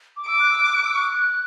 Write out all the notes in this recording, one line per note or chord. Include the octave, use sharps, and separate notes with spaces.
D6
D6 E6
F#6
E6
F#6
F#6
E6
F#6